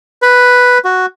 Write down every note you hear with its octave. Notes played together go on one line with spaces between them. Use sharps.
B4
F#4